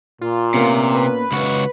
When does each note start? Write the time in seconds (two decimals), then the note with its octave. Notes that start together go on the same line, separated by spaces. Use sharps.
0.21 A#2 F4
0.54 C3 A#3 B3 C#4
0.95 B4
1.32 C#2 F#4